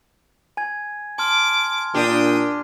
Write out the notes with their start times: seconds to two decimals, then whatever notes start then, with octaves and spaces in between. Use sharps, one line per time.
0.57 G#5 G#6
1.18 A5 C6 D6 F6
1.94 A#2 D4 G4 G5 D#6